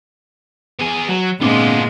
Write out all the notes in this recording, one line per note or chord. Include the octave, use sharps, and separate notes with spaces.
B3 G#4
F#3
A#2 G#3 B3 C4 D4 F4 D6